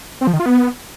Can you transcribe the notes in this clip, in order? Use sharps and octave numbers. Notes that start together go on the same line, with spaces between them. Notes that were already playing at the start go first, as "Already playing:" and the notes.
C4
F3
D#3
F4
B3